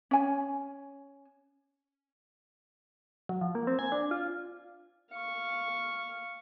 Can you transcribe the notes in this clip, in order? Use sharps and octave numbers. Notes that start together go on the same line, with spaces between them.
C#4 G#5
F#3
F3
A#3
C4
G#5
D4
F4
F5 C#6